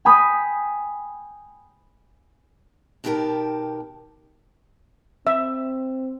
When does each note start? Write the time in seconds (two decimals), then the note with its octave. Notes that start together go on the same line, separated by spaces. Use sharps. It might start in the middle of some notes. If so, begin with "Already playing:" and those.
0.05 G5 G#5 B5 D#6
3.04 B2 D#3 B3 G4 A#4 A5
5.27 C4 E5